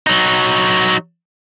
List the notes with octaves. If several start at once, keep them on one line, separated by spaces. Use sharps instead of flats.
F#3 D#4